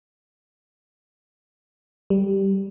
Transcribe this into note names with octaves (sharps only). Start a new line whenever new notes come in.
G3